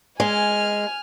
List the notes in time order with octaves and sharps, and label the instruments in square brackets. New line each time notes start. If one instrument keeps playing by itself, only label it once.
[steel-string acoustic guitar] G#3 [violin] G#5 F6